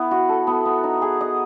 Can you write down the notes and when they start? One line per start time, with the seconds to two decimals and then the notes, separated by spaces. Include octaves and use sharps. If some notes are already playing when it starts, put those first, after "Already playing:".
Already playing: B3 E4
0.11 F#4
0.29 A4
0.47 B3
0.65 B3
0.84 D#4
1.02 G#4
1.21 D#5